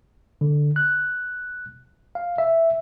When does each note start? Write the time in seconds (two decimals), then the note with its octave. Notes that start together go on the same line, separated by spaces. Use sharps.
0.41 D3
0.76 F#6
2.15 F5
2.38 E5